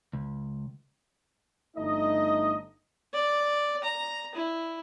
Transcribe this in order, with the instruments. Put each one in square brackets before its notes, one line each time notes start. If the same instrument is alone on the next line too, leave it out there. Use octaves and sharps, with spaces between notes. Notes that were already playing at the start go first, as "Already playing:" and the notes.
[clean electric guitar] C#2
[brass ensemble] G1 A3 D#4 D#5
[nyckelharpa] D5
A#5
E4